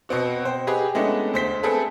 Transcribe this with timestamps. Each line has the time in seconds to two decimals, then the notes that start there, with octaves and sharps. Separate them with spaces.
0.09 B2 B3 C4 F#4
0.45 C5 G5
0.67 G4 G#4 B4 D#5
0.95 G#3 A3 B3 C#4 D4 E4
1.33 D2 C5 B6 G7
1.63 A3 C4 G#4 A4 B4